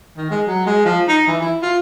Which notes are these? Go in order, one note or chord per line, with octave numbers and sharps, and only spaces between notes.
D#3
G#3
F#3
G#3
F3
D#4
E3
E4
F4